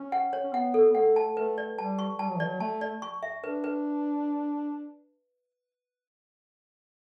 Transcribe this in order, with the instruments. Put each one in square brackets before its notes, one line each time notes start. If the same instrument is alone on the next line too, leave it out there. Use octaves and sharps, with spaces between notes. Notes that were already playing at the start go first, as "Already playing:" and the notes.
Already playing: [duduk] C#4
[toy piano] F#5
C#5
[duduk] C#4
[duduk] B3 [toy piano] F#5
[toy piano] A4
[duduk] B3
[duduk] A3 [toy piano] F#5
[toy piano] A5
[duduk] A3 [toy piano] B4
[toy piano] D5
[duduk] G3 [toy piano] A5
[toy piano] C#6
[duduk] G3 [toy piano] A5
[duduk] F#3
[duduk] E3 [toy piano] D5
[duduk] F#3
[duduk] A3 [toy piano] A5
[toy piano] D5
C#6
E5
[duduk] D4 [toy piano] B4
[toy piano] B4